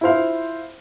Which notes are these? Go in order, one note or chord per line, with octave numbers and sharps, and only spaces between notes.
E4 F4 C5 F5